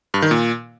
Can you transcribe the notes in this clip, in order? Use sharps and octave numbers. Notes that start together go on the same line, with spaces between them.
G2
D#3
A#2